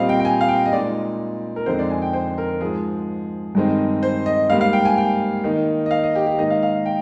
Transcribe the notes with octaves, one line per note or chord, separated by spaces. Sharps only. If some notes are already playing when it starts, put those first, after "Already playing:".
Already playing: A#2 G3 C4 D#5 F5
G5
G5
G#5
F5
G5
D#5
A#2 G#3 D#4 D5
A#4
F2 D3 G#3 C4 D#4 C5
D5
G#5
G5
C5
A#4
G#2 F3 G#3 G#4
G2 D#3 G#3 C4 D#4
C5
D#5
G#2 G3 A#3 F5
F5
G5
G#5
G5
D#3 A#3 D#4
D#5
F5
D#5
G4
G4
G#2 D#3 A#3 D#4 D#5
F5
F5
G5